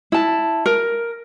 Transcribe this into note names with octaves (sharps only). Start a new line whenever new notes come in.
E4 A5
A#4